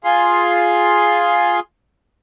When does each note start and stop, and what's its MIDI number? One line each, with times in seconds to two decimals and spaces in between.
0.04 1.60 65
0.04 1.60 68
0.04 1.60 84